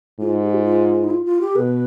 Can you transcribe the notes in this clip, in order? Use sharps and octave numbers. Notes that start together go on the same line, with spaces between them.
G#2 F4
G4
F4
F4
D#4
F4
F4
G4
B2 B4